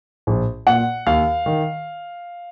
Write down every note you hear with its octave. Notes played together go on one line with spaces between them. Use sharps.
A#1
A#2 F#5
D#2 F5
D#3